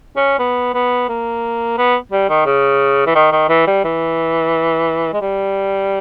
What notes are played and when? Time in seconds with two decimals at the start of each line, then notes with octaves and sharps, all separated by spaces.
0.16 C#4
0.39 B3
0.74 B3
1.09 A#3
1.78 B3
2.12 G3
2.29 D#3
2.46 C#3
3.07 E3
3.15 D#3
3.32 D#3
3.49 E3
3.67 G3
3.84 E3
5.13 G#3
5.21 G3